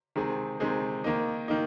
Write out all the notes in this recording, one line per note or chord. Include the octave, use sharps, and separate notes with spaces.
C3 D#3 G#3 C4 G#4
C3 D#3 G#3 C4 G#4
D#3 A#3 D#4
D#3 A#3 D#4